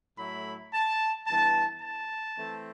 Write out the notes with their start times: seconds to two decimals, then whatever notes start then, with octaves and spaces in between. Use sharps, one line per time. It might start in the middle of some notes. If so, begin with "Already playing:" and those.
0.18 A2 F#3 A3 E4 B5
0.73 A5
1.27 G2 E3 B3 A5
1.82 A5
2.38 E3 A3 C4